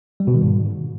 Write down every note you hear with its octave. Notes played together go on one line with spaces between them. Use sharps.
G3
B2
D#3
G#2